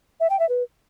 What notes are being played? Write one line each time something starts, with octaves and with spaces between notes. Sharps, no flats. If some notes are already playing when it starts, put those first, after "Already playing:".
E5
G5
E5
B4